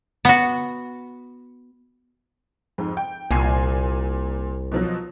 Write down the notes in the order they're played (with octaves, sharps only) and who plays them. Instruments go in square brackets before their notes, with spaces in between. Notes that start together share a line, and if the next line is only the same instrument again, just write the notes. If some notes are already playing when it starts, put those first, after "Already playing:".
[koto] B3 F#4
[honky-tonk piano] F2 G#2
G5
[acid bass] C2 [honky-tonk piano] A#2 G#5 C7
[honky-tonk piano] B2 F3 F#3